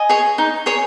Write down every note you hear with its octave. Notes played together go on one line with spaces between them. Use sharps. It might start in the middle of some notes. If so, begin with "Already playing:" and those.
Already playing: D#5 G#5
G#4 C#5
D#4
G#4 C#5